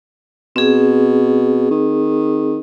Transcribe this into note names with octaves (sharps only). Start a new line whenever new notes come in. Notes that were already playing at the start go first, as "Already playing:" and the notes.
B2 C4 G#4
D#3